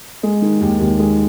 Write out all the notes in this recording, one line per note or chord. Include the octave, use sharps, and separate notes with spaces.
G#3
D#3
D#2
D#2
G#3